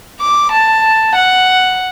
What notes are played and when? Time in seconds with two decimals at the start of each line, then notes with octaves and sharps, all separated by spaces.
0.21 D6
0.52 A5
1.15 F#5